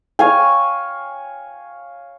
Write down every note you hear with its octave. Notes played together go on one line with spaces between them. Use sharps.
C#5 F5 G#5